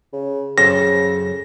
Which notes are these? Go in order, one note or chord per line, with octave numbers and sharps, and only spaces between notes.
C#3
F#2 C#3 A4 C5 A#6